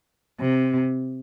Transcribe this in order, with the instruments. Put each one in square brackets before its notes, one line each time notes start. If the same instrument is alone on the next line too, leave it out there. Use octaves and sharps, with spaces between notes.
[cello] C3